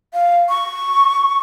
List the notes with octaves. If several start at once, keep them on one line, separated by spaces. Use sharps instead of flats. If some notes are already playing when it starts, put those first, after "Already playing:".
F5
C#6